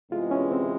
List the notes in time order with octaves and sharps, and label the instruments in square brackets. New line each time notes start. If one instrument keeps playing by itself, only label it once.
[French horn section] E2 C3 E3 G#3 [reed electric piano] F4
[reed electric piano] C#4
C4